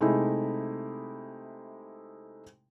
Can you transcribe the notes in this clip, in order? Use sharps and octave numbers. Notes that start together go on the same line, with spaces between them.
C3 G#3 A3 D#4 E4